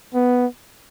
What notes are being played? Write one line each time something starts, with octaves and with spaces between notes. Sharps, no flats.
B3